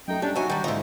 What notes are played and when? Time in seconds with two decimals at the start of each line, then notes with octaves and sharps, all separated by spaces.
0.08 F#2 A3 D#4 G5
0.22 G3 C#4 D4
0.36 F#3 D#4 F#4 E5 G#5
0.50 D#3 G3 G5 A5
0.64 G#2 D3 D#4 F4 C5 E5